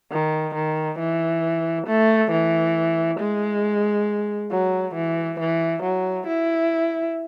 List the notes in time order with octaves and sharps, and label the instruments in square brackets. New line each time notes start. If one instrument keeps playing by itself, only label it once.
[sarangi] D#3
D#3
E3
A3
E3
G#3
F#3
E3
E3
F#3
E4